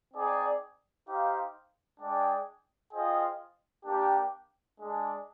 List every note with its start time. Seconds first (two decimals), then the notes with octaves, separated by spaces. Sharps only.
0.14 C4 D#4 G#4 D5
1.07 D#4 G4 C5 F5
2.00 G#3 D4 G#4 D5 G5
2.93 F4 G#4 C5 D#5 G5
3.86 A#3 D4 G4
4.79 G#3 D4 G#4